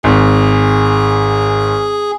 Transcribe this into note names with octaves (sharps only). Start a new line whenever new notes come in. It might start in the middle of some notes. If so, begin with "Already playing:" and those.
G#1 G#4